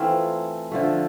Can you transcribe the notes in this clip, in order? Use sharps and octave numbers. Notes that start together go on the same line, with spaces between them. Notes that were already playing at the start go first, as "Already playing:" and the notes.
Already playing: E3 A3 C4 F4
D3 F3 A3